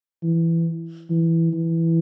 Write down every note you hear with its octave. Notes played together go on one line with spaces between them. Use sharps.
E3
E3
E3